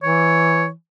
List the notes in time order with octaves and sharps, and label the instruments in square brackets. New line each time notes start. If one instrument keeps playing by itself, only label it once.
[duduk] E3 [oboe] C#5